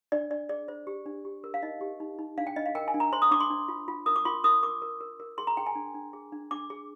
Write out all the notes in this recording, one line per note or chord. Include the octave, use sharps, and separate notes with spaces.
D4 D5
D4 D5
G#4 D5
C5
G4
D4
G4
A#4
F5
D#4 D#5
G4
D#4
D#4
D4 F5
G5
D4 D#5
F5
A#4 G5
G#5
D4
A#5
C5 C6
D#6
D4 D6
C6
D4
F4
F4
A#4 D#6
D6
F4 C6
A#4 D#6
A#4 D6
A#4
A#4
A#4
G#4 C6
A#5
G#4 G5
G#5
D4
D4
G#4
D4
D4 D6
G#4